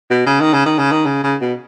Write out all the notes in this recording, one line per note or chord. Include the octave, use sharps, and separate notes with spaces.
B2
C#3
D#3
C#3
D#3
C#3
D#3
C#3
C#3
B2